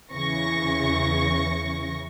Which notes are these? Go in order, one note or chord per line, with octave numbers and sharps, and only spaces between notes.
E2 C#3 E3 C#6 A#6